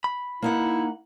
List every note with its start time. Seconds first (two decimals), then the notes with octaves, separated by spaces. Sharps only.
0.04 B5
0.42 A#3 D#4 E4 F#5